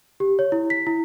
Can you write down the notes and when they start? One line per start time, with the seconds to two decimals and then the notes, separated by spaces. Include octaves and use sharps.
0.20 G4
0.39 C#5
0.52 E4
0.70 B6
0.87 E4